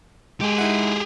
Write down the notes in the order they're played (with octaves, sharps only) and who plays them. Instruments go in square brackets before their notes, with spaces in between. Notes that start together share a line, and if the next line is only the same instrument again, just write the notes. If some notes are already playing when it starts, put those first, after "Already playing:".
[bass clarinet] G#3 [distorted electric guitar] G4 G#4
[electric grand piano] D#4 E4 F#5